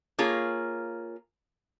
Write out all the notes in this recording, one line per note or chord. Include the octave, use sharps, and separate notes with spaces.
A#3 F4 G#4 C#5